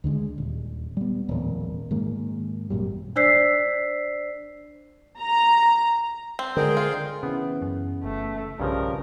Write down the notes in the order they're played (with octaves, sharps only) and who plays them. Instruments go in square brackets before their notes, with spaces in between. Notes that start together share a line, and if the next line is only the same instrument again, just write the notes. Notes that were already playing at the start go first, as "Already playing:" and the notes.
[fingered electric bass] D2 D3 D#3 G#3
D#1
G3 B3
D#1 A1 F2
G#2 D#3 A#3
G#1 F#2 A#2 G3
[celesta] D4 C5 D5 E6 B6 C7
[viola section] A#5
[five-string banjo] C4
[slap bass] D3 [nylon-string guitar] G#3 A#4 [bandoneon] G#4 C5 G5
[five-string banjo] F4
[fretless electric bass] C#3 E3 [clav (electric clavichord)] B3
[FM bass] F#2
[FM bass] F1 [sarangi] A3
[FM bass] B1 [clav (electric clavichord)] G2 C#3 F3 [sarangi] A#4